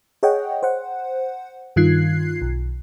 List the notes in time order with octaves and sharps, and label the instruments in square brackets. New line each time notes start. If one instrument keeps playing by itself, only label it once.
[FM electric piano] G#4 C#5 D#5 F#5 G5
C5 F#5
G2 D#3 F4 F#6 G#6 C7
B1